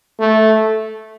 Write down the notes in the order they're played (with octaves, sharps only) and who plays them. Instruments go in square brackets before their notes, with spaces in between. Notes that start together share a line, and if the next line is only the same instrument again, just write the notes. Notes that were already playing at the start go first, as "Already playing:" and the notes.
[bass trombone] A3